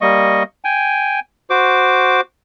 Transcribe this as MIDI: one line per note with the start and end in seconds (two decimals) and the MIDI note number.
0.01 0.43 55
0.01 0.43 58
0.01 0.43 75
0.01 0.43 85
0.65 1.20 79
0.65 1.20 80
1.50 2.21 66
1.50 2.21 72
1.50 2.21 86